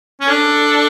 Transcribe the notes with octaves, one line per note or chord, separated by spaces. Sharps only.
C#4
D4 A4